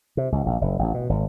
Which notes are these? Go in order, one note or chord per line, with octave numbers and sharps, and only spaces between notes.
C3
C#2
A#1
F#1
A1
B2
G#1